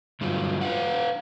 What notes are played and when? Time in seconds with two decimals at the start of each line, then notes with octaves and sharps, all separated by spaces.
0.21 G2 D3 F#3 F4
0.61 B4 F5 F#5